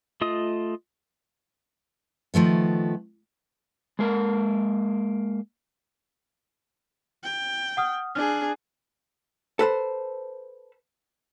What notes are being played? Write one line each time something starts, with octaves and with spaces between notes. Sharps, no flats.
A3 F4 D#5 D#6
D#3 F3 A3 B3
G#3 A#3 A#4
G5
F#5 D#6 F6
D4 G#4 F6
A4 B4 C5